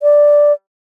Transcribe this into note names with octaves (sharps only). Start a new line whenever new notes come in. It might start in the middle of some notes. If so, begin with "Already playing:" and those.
D5